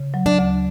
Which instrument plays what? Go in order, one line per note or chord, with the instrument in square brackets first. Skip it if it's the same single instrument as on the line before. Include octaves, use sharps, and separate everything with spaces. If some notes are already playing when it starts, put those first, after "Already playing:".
Already playing: [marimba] C#3
F#3
[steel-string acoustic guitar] D4
[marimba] D2